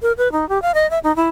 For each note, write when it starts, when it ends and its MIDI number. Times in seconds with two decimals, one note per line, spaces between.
0.02 0.12 70
0.18 0.31 71
0.32 0.47 63
0.49 0.61 67
0.62 0.72 77
0.74 0.89 75
0.90 0.99 76
1.04 1.14 63
1.16 1.29 64